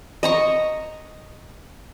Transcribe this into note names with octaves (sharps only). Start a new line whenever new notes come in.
D#5 A#5 C#6